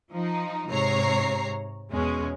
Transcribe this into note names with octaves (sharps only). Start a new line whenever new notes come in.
F3 D#4
G#2 C3 C#5 A#5 C7
E2 B2 G#3 C#4